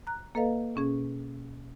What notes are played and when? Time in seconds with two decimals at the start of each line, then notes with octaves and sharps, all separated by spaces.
0.07 A#5 F#6
0.35 A#3 A4 B4 D#5 F5
0.76 B2 C#4 G#4